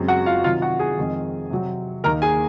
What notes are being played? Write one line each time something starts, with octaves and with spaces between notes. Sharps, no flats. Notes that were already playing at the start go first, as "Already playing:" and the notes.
Already playing: F#2 C#3 G#3 C4
F#4 F#5
F4 F5
C3 D#3 F#3 F4 F5
F#4 F#5
G#4 G#5
F2 D#3 G#3 C4 D#4
C3 F#3 C4
D#2 D#3 A#3 D#4 A#4 A#5
G#4 G#5